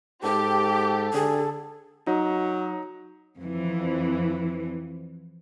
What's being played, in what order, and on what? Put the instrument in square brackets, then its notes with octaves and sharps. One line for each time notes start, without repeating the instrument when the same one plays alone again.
[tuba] G#2 [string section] G4 [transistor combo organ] A4 [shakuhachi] D6
[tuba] D3 [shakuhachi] G#4
[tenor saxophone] F#3 [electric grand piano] D#4
[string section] F2 E3